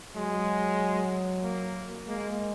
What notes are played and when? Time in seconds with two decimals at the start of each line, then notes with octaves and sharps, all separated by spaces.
0.16 F#3 G#3
1.44 A#3
2.08 G#3 A#3